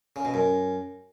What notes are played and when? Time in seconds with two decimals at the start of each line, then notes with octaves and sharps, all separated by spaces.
0.16 C#3
0.25 B2
0.34 F#2